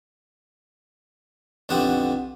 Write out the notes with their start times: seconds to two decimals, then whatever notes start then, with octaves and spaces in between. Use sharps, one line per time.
1.69 B1 F2 D3 B3 F#4 G4